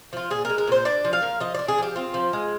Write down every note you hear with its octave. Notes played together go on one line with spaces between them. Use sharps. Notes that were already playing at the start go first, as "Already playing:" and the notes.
F3 F4
A#2 G#4
A#4
G#3
A#4
A#2 C5
D4 D5
F3
F5
A#3
F3 D#5
D4 D5
G#4
F3 G4
C4 F4
F3
G#3